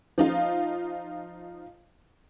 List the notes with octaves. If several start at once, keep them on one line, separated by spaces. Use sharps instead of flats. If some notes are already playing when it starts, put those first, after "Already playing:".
F3 D#4 F4